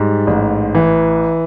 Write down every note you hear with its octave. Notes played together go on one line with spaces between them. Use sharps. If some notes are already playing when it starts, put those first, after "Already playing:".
Already playing: G#2 G3
A1
E3